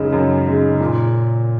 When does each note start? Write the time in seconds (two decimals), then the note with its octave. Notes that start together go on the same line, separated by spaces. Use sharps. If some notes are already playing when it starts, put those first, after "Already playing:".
Already playing: F#2 C#3 G#3 D#4
0.13 F#2
0.46 C#3 G#3 D#4
0.80 A#2